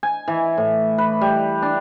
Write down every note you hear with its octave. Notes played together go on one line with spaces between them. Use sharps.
G#5
E3
A2
B4
G3
D4